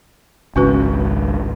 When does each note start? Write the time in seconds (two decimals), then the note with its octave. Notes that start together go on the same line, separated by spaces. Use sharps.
0.56 G#1 C#2 C#4 F#4 B4